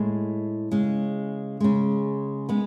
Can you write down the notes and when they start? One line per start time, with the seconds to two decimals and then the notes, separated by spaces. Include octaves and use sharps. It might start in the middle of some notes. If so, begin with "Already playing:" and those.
Already playing: A2 G#3
0.72 C#3 G#3
1.60 C#3 G#3
2.49 G#3 B3